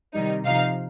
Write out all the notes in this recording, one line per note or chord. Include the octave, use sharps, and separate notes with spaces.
C3 D#3 G3 D#4
C3 F3 D#4 F5